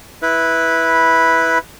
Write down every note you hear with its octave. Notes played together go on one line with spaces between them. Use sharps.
E4 B4